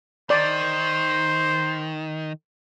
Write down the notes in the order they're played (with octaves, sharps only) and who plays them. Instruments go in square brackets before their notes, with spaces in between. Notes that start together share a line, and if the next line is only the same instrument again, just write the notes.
[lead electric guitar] D#3 [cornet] C5 [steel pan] D5